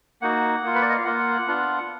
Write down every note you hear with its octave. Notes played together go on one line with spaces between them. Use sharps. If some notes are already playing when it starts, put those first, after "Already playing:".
A#3 D#4 F#4 F#5
A#3 F4
B4
D5
D#5
F5
A#3 F4 F#5
B3 D4 F4